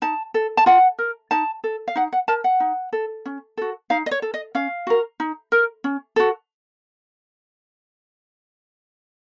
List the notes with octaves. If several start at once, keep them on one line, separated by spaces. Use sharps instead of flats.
D#4 A5
A4
A5
F4 F#5
A#4
D#4 A5
A4
F5
D#4 F#5
F#5
A#4 A5
F#5
D#4
A4
C#4
F#4 A4
D#4 F5
D#5
C#5
A4
D#5
C#4 F5
F#4 A#4
D#4
A#4
C#4
F#4 A4